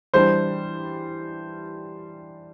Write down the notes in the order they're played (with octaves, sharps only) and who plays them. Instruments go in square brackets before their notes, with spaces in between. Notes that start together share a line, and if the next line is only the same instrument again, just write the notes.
[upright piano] E3 G3 D4 [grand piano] C5